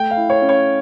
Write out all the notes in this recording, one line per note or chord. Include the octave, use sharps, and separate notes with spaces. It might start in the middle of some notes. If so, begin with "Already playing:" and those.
Already playing: A3 G5
F5
E4
C#5
C#4
C#5